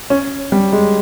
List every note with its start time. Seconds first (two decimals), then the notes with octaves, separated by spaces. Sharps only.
0.10 C#4
0.52 G3
0.73 G#3